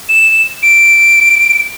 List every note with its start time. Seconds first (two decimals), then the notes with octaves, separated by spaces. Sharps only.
0.09 E7
0.63 D7